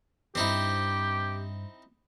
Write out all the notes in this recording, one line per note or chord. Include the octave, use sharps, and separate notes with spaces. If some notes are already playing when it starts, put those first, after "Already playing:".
E2 G2 C4 D#4 E4 G4